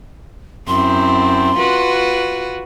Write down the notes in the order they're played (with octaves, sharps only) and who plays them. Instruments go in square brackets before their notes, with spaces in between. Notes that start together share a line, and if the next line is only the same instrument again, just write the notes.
[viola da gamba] F#2 C4 E4 [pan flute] C6
[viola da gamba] F4 F#4 B4